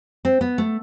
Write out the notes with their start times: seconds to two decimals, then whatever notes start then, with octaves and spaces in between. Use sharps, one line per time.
0.25 C4
0.41 B3
0.58 A3